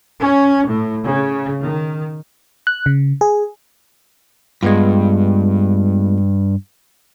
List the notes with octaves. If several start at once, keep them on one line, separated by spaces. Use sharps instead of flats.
C#4
A2
C#3
D#3
F#6
C#3
G#4
G2 G#3 B3 F4